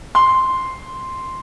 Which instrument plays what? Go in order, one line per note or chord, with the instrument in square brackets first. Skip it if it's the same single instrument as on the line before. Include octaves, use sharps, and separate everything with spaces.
[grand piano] C6